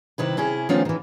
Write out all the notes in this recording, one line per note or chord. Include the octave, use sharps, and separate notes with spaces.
C3 D#3 E4 B4
C3 C#4 E4 G#4
D#3 F3 A3 B3 C#4 F4
D#3 E3